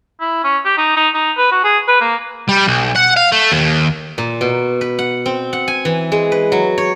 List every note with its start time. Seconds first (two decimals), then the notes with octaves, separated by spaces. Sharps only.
0.20 E4
0.44 C#4
0.65 G4
0.78 D#4
0.96 D#4
1.14 D#4
1.37 B4
1.51 F#4
1.64 G#4
1.88 B4
2.01 A#3
2.49 G3
2.68 B1
2.96 F#5
3.17 F5
3.32 A3
3.52 D#2
4.18 A#2
4.41 B2
4.81 B4
4.99 F#5
5.26 C4
5.53 F#5
5.68 G#5
5.85 E3
6.12 G#3
6.32 B4
6.52 F#3
6.78 C#5